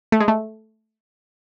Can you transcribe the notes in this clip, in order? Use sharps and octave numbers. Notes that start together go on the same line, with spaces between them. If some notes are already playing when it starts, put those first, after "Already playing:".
A3
G#3
A3